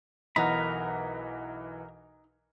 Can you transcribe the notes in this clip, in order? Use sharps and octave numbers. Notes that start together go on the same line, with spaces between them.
B1 E3 D#4 A#4 F#5 B5